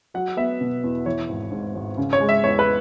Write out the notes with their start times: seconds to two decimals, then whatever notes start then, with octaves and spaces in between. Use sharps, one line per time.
0.14 F#3 F#5
0.37 B3 E5
0.61 B2
0.84 E2
1.06 E3 C#5
1.29 G#1
1.51 G#2
1.75 G#1
1.97 C#3
2.13 C#5
2.21 G#3
2.29 E5
2.44 E2 C#5
2.59 B4